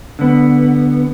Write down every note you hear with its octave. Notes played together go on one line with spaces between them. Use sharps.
D3 B3